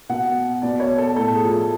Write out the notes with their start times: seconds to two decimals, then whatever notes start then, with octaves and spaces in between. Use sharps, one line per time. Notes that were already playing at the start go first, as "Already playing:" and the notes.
0.09 B2 F#5
0.62 B2 D5
0.80 C#5
0.98 A4
1.16 A2 A4
1.34 G#4
1.43 F3
1.52 A4